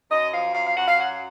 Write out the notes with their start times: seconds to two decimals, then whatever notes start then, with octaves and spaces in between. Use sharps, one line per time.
0.10 F#2 D#5
0.32 F3 F5
0.54 F#2 F5
0.66 F5
0.76 F#2 F#5
0.87 F5
0.98 F#3 F#5